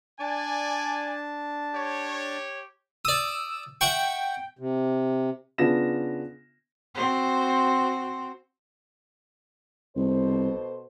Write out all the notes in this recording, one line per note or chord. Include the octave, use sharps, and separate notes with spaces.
D4 D5 G#5 A5
G4 C#5
D5 D#6 E6
E5 F#5 G5 C#6
C3
C#3 B3 D4 F4 A#6 E7
C4 F#4 C5
C2 B2 A4 C5